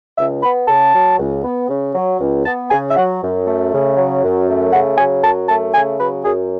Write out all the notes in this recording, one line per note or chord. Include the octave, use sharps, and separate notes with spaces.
C#2 E5
B3 B5
C#3 A5
F#3
C#2
B3
C#3
F#3
C#2
B3 A5
C#3 G#5
E5
F#3 F#5
F#2
A3
C#3
F#3
F#2
A3
C#3 F#5
F#3 G#5
F#2 A5
A3 A5
C#3 G#5
F#3 B4
F#2 G#4